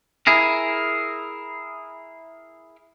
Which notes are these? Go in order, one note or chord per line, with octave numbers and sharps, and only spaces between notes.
E4 G#4 A#4